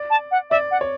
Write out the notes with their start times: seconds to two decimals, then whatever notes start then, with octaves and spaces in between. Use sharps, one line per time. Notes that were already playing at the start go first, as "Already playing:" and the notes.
Already playing: D5
0.10 A5
0.31 F#5
0.50 D5 E5
0.71 F#5
0.81 C#5